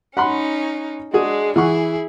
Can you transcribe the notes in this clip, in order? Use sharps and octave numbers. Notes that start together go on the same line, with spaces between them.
C#4 D#4 F#5 B5 C6
G#3 D4 F#4 G#4
E3 E4 G#4 F#5 C#6